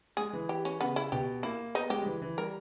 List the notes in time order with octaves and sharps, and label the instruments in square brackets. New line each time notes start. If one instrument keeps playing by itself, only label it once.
[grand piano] G#3 [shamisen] G#4
[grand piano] E3
[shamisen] G4
C#4
[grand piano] C#3 [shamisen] B3
[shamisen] E4
[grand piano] B2 [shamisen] G4
[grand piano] A#3 [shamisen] E4
[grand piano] B3 [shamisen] D#4
[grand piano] G#3 [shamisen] G4
[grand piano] G3
E3
E3
[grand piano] G3 [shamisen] A#4